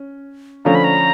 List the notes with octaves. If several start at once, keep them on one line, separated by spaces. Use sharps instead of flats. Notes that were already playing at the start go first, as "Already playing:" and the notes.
Already playing: C#4
D3 F3 A3 C#4 A#5
B5
A#5